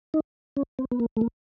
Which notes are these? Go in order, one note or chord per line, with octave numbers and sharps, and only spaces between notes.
D#4
C#4
C4
B3
A#3
A3
A#3